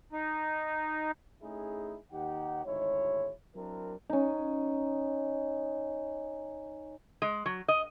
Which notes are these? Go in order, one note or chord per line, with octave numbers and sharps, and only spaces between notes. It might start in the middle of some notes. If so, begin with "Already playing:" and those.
D#4
A3 C#4 D#4 E4 G#4
D#2 D#4 G4 F#5
G#1 D2 G#3 D#4 E4 C#5
F#3 C4 D4 E4 A#4
C#4 D#4
G#3
F#3
D#5